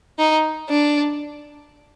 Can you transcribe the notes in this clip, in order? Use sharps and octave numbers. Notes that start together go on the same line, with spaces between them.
D#4
D4